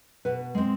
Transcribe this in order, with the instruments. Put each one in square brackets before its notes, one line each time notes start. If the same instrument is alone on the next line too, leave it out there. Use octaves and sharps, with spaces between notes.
[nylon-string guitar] B2 B4
G#3 C4